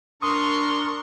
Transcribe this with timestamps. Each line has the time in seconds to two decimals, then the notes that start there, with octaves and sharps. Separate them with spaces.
0.22 D4 A#4 C6 C#6 D#6